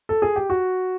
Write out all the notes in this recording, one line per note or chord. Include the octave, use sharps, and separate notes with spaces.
A4
G#4
G4
F#4